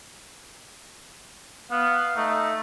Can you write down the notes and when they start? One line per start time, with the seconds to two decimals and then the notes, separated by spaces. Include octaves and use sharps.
1.71 B3 F5
2.16 A3 D#4